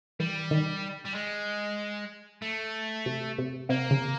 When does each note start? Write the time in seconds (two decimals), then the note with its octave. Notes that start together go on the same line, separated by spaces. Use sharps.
0.20 E3 G3
0.51 D#3
1.06 G3
1.15 G#3
2.42 A3
3.06 C3
3.38 C3
3.69 C3 A#3
3.91 C#3